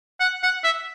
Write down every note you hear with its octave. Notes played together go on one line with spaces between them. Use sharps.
F#5
F#5
E5